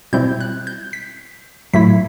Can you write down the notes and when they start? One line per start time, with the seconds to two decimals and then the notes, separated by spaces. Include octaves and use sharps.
0.13 B2 G3 C4 E4 G6
0.40 F#6
0.67 G6
0.93 B6
1.73 A2 F#3 A3 E4 B6